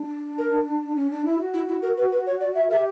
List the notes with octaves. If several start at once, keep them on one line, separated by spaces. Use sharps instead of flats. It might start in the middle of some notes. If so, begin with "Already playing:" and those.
Already playing: D4
A#4
C#4
D4
E4
F#4
E4
E4
A#4
B4
B4
C#5
D5
E5
A#4 E5
G4